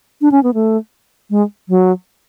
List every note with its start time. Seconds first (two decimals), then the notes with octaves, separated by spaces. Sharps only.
0.21 D4
0.32 C#4
0.43 B3
0.54 A3
1.30 G#3
1.69 F#3